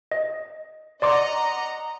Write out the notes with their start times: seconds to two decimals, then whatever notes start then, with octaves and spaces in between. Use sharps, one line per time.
0.12 D#5
1.02 D5 D#5 F#5 A#5 C6 D6